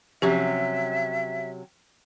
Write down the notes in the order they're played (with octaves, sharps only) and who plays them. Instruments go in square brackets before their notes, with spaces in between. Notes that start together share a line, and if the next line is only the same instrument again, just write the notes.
[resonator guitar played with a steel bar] C3 F#3 C#4 [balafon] F3 G4 [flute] E5